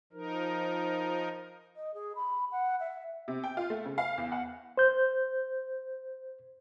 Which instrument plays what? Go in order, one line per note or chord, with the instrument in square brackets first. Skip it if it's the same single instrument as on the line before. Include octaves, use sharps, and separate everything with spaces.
[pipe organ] F3 D#4 A#4
[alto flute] D#5
G#4
B5
F#5
E5
[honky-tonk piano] C3
G5
F4
A3
C#3
F5
E2
F#5
[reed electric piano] C5 G6